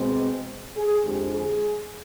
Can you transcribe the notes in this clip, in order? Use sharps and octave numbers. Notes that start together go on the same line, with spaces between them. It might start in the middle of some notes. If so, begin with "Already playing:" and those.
Already playing: B2 G#3 C4
G#4
F2 D3 F3 G#3 G4
G#4